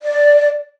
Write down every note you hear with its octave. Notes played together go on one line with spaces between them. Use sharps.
D5